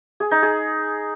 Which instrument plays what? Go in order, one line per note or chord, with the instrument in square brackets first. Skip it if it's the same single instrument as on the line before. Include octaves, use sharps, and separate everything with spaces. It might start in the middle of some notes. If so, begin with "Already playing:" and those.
[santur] G#4
D#4
G#4